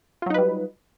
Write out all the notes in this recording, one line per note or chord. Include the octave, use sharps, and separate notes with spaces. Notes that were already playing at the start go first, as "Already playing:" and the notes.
F#3 G3 D#4 F4 B4